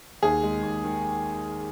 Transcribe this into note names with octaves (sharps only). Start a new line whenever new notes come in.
D#2 G#4
G#3
D#2
D#3